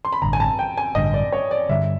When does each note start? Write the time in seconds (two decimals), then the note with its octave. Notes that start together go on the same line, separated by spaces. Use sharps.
0.05 C6
0.13 B5
0.22 A1 G2 D3 A#5
0.33 G#5
0.40 A5
0.59 G5
0.77 G#5
0.95 A1 G2 D3 D#5
1.14 D5
1.32 C#5
1.51 D5
1.69 G2 D3 G3 E5